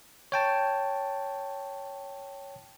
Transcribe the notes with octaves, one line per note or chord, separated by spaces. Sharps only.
C#5 G5 A5